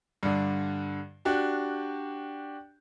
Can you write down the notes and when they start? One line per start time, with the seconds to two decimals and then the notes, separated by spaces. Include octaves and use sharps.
0.23 G2 D3
1.25 D4 F#4 G4